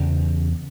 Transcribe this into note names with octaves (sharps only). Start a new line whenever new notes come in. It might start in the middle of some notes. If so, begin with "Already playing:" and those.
Already playing: E2 C#3